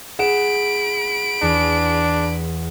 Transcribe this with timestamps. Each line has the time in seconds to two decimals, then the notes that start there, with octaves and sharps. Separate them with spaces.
0.19 G#4 F#5 B5 D7 E7
1.42 E2 D4